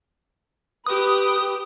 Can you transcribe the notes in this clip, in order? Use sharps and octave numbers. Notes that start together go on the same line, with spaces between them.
G4 B4 D#6